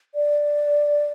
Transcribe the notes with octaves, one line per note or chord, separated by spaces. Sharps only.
D5